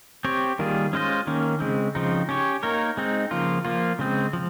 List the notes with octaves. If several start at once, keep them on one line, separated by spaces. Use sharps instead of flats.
C4 G4 C#5
D#3 G3 A#3 F4 G#4
G#3 C#4 F4 C5 D#5
D#3 A#3 C#4
C#3 G#3 C4
C#3 F3 C4 D#4
C#4 G4 C#5
A#3 D#4 A#4 C#5
G#3 C4 D#4
C#3 F3 A#3 F4
F3 A#3 F4
C#3 G#3 C4
F3